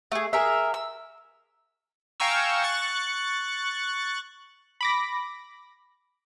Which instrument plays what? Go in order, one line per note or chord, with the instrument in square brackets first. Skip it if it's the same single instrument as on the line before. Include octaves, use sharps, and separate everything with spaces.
[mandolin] A3 G#4
G#4 A#4 E5
E6
[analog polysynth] F5 G5 G#5 A#5 C#6 E6
C#6 F#6 A6
[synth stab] B5 D6 A#6